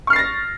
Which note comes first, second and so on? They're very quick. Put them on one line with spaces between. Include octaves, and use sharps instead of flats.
C#6 F6 C7 A6 A#6